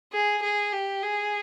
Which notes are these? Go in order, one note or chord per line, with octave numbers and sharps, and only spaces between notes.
G#4
G#4
G4
G#4